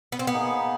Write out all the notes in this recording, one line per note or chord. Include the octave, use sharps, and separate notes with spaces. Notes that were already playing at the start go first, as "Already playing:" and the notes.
B3
C4
B3
A#3 D#4 G#4